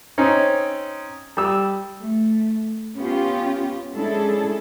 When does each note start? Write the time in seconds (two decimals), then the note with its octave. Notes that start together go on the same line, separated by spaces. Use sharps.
0.18 C4 C#4 D#4
1.37 G3 E6
2.01 A3
2.97 B3 C#4 F4 G4
3.93 G#3 C#4 D4 E4 G#4 A4